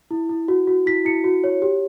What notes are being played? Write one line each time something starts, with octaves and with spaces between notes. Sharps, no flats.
E4
E4
F#4
F#4
E4 B6
E4 C#7
F#4
C#5
G4